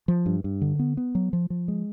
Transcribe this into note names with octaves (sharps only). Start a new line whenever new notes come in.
F3
G2
G2
D3
B3
B3
F#3
F3
F3
G#3